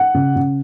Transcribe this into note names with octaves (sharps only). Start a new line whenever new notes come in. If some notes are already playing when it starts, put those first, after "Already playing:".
Already playing: F#5
C#3
C#3